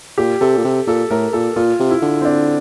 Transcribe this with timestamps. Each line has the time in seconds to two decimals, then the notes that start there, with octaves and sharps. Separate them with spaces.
0.18 A#2 G4
0.41 C3 A4
0.57 A#2
0.64 C3
0.87 A#2 A4
1.10 A2 A#4
1.33 A#2 A4
1.56 A#2 F4
1.79 C3
1.91 E4
2.02 D3
2.21 C4
2.25 D4